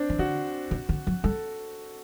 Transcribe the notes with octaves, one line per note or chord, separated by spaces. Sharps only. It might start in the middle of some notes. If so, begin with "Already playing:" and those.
Already playing: C4 D4
E3
D3 F#4
C3
D3
F#3
G3 A4